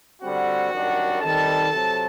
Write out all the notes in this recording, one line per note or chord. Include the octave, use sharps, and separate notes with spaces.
D3 G3 C4 F#4 F#5
F#2 D#3 G3 D4
D#3 G3 C4 D#4 A4 A5
C3 F#3 C4